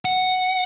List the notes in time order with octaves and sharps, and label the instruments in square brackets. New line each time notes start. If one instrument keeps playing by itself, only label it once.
[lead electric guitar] F#5